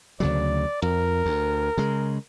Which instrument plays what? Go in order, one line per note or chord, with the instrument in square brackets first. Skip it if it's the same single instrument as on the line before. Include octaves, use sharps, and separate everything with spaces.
[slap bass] D2 C#3 F#3 [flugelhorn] D5
[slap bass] F2 [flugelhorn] A#4
[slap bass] D2
C#3 G#3